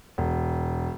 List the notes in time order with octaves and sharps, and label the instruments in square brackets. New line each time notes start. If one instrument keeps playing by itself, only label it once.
[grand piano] E1